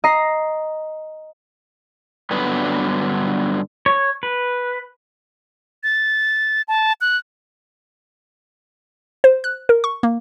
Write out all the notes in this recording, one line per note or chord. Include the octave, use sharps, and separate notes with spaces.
D#5 A#5 C7
G2 D3 F#3 G3 B3 B4
C#5
B4
A6
A5
F#6
C5
F#6
A#4
C#6
A#3